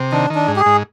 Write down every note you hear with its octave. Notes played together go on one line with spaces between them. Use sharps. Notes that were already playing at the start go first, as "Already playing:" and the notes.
Already playing: C3
D#3 D4
D#3
D4
G#2
G4
G#4
G#2